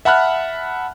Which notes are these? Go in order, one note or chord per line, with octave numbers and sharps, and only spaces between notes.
E5 F#5 A5 B5 F6 F#6